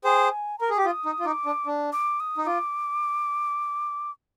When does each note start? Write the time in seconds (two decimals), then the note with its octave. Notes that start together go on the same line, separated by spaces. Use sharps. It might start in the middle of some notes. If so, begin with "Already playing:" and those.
0.04 G#4 C5 G5
0.31 G#5
0.58 A#4 A#5
0.70 G#4
0.76 G4 D6
0.85 F4 D#6
1.05 D#4
1.19 F4
1.26 D#4 D6
1.46 D4
1.66 D4
1.93 D6
2.20 D#6
2.37 D#4
2.46 F4 D6